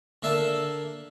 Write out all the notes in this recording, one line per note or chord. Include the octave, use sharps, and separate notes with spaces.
D3 A#3 E5 A5